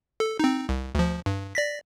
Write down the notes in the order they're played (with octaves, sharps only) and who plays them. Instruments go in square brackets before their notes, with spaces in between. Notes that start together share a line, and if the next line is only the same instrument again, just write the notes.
[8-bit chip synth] A4
C4 D#4
C2
D2 F3
G2
D5 A#6 B6